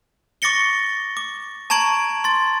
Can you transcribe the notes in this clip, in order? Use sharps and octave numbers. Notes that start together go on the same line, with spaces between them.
C#6 D6 A6 A#6 C#7 G7
D6
A5 A#5 C#6 G#6 D7 F#7
C6 A6